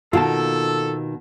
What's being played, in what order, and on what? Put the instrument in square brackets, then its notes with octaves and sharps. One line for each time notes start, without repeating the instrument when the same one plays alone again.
[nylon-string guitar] B2 D#3 A#3 [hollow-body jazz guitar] F4 F#5 A5 [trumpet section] A4